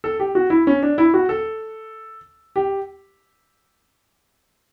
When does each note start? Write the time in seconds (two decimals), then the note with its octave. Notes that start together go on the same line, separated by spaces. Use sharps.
0.04 A4
0.20 G4
0.35 F#4
0.50 E4
0.67 C#4
0.83 D4
0.98 E4
1.14 F#4
1.29 A4
2.56 G4